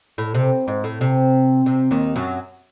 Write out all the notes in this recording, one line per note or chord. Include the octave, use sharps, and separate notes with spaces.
A2
C3
G#2
A2
C3
C3
D#2 D#3
F#2 F#3